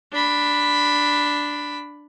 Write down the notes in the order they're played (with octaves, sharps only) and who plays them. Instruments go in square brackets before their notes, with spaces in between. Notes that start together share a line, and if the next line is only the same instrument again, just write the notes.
[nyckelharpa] D4 B5